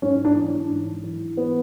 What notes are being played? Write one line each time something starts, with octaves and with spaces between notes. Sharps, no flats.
G#2 C#4
D4
E3
G#2
E3
B3